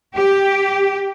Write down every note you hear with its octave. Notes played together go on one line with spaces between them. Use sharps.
G4